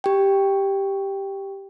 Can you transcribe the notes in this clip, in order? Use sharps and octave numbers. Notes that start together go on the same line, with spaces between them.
G4 G5